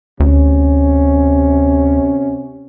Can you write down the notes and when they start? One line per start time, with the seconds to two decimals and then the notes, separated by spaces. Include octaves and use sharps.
0.20 D2 C3 C#4